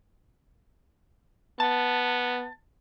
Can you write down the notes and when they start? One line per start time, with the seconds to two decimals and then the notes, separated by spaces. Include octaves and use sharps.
1.60 B3 A5